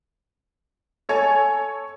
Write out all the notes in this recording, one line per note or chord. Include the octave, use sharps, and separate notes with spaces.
A4 C#5 G#5 A6